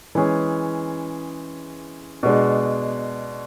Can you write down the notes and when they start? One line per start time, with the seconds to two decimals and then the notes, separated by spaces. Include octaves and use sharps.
0.15 E3 G#3 C#4 G#4
2.23 B2 G#3 D4